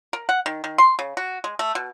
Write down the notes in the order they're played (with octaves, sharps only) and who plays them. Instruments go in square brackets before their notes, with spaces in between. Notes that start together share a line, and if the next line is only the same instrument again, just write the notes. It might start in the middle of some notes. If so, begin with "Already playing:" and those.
[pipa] A#4
F#5
D#3
D#3
C6
C#3
F#4
G#3
A3
B2